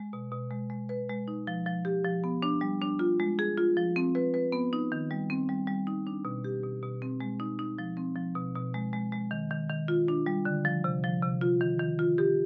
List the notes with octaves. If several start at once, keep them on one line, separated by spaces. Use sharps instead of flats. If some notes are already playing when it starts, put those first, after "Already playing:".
Already playing: G#3
B2
B2
G#3
G#3
B4
G#3
D#4
F3
F3
G4
F3
B3
D4
G3
D4
F4
G#3
G#4
F4
F3
C4
B4
B4
B3
D#4
D#3
G3
C4
G3
G3
D#4
D4
B2
G4
B2
B2
C4
G#3
D#4
D#4
F3
C4
F3
B2
B2
G#3
G#3
G#3
D#3
D#3
D#3
F4
D4
G3
D3
F3
C3
F3
C3
F4
D#3
D#3
F4
G4